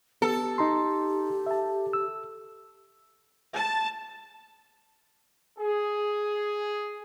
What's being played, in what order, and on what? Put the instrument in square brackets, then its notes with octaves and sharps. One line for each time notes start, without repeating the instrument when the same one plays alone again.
[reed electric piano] B3 [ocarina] G4 [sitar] A4
[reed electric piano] D#4 A#5 C6
E5 A5
E6
[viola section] A5
[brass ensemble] G#4